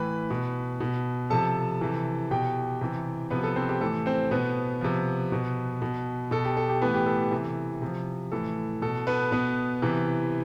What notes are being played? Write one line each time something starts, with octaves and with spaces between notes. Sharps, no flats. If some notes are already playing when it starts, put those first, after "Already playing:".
Already playing: A2 E3 B4 B5
B2
B2
C3 F3 A4 A5
C3 E3
B2 G4 G5
C3 E3
C3 F3 B3 B4
A4
C4 C5
G4
A2 E3 A4
C4 C5
B2 B3 B4
C3 F3
B2
B2
B2 A4
G4
A4
G4
A2 E3 B3 B4
G4
A4
C3 E3
C3 F3
A2 E3 A4
B2 A4
B3 B4
B2 B3 B4
C3 E3